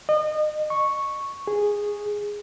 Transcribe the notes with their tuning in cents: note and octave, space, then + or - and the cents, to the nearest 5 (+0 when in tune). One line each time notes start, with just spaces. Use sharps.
D#5 -35
C#6 -5
G#4 -10